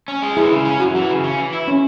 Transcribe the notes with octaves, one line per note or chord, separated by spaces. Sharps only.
C#4
G#3
E3 E4 G#4
C#3
C#4
F#2 F#4
E3
C#3
C#4
E3
E4
C#4